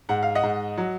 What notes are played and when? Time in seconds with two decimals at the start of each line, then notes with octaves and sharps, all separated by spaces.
0.09 G#2 F#5
0.23 F5
0.35 D#5 F#5
0.43 G#2
0.77 F#3